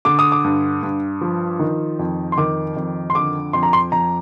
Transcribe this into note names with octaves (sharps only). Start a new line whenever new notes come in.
D3 D6
D#6
D6
G2
G2
F3
D#3
F2
C6
D#3 D6
F2
C6
D3 D6
F2 C6
A#5
C6
F2 A#5